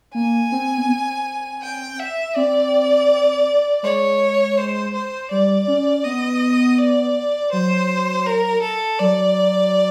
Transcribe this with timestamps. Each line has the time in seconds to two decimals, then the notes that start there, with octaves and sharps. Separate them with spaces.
0.14 A#3 G#5
0.52 C4
0.78 B3
0.88 C4
1.62 G5
1.99 E5
2.35 C4 D5
3.83 G#3 C#5
4.57 C5
4.94 C5
5.31 G3 D5
5.68 C#4
6.04 B3 D#5
6.78 D5
7.52 F#3 C5
8.26 A#4
8.62 A4
8.99 F#3 D5